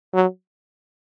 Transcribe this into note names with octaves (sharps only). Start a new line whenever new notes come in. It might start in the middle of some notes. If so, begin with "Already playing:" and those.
F#3